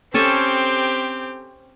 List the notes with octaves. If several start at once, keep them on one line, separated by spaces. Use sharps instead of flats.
C4 C#4 G4 A4 G#5